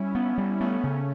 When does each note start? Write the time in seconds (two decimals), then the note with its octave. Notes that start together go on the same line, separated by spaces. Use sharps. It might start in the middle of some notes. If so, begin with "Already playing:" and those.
Already playing: G3 C#4 E4
0.15 B3
0.38 G3
0.60 A3 B3 C#4
0.83 C#3